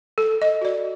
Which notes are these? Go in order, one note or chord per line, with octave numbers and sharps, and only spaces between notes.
A4
D#5
F#4 D5